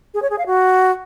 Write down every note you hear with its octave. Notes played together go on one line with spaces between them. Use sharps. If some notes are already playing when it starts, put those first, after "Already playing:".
G#4
C#5
G#4
F5
F#4